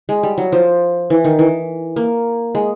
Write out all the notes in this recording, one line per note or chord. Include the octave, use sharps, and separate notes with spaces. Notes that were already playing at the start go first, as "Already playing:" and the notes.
G#3
G3
F#3
F3
E3
D#3
E3
A#3
G#3